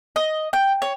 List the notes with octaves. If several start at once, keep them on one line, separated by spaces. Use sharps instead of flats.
D#5
G5
C#5